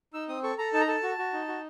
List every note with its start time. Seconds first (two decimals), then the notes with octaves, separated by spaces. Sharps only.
0.14 D#4 E6
0.28 C4 D#6
0.43 A4 C#6
0.58 A4 A#5
0.73 D#4 A5
0.81 A#5
0.88 A4 A5
1.03 F#4
1.18 F#4
1.33 D#4
1.48 F#4